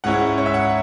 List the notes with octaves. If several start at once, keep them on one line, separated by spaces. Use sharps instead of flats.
G#2 G#3 C#4 E4 F#5
C#5
E5
F#5